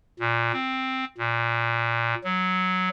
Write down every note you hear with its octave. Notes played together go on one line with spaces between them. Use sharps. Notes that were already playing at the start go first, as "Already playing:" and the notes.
A#2
C4
A#2
F#3